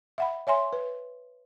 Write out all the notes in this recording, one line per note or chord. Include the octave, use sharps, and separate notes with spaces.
E5 F#5 B5
C#5 E5 G#5 C6
B4